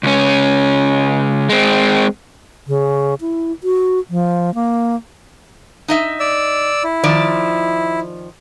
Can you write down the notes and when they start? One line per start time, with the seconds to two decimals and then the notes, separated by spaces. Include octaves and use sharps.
0.03 C#2 C#4
1.49 G#3 C4
2.67 C#3
3.21 E4
3.63 F#4
4.10 F3
4.54 A#3
5.88 D#4 D#5 E5
6.20 D5 E6
6.84 E4
7.04 D#3 F3 D5